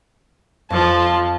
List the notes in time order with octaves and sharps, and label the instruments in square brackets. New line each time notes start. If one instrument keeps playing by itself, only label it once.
[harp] F2 [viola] F3 A5